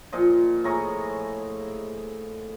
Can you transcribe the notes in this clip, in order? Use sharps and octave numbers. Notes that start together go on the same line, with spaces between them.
A#2 F3 D#5
A2 G#4 A#5 C#6